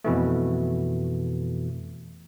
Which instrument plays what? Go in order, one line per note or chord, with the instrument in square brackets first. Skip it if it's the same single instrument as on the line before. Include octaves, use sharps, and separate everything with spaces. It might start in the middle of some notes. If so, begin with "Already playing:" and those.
[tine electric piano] F2 B2 E3 A3